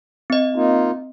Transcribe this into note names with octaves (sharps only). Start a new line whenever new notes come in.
C4 D#5
A#3 D#4 F4